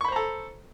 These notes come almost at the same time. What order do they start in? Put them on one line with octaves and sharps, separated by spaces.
C#6 B5 C5 A#5 A4